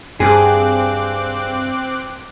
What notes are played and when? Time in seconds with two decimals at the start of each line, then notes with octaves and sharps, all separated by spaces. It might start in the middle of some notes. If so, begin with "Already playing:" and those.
0.20 G2 C4 G#4 D6 F#6